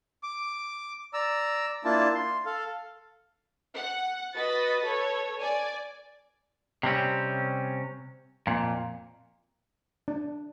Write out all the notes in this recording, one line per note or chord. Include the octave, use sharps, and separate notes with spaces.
D6
D5 A#5 E6
A#3 D4 E4 F4 A5
C6
A4 F5
F#5
F#4 B4 D#5 B5 A6
A4 B4 C#5
D5 G#5
C3 G3 C4 C#4
F2 A#2
D4